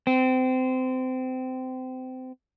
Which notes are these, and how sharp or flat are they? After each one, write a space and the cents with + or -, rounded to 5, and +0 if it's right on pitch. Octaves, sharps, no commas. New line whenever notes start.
C4 -25